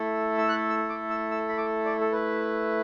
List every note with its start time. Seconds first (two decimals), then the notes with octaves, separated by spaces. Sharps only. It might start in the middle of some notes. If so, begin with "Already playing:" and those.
Already playing: A3 E4 A4
0.38 E6
0.49 F#6
0.69 E6
0.89 D6
1.10 E6
1.31 E6
1.49 B5
1.58 D6
1.85 D5
2.01 A4
2.12 B4